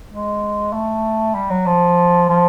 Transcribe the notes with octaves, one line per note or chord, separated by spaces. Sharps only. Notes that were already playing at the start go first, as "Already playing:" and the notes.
G#3
A3
G3
F#3
F3
F3